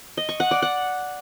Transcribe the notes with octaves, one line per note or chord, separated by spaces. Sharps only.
D#5
C#6
F#5
D5
F#5